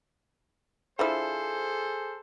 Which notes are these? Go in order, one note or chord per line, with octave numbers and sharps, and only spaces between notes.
D3 F3 E4 G#4 A4 C5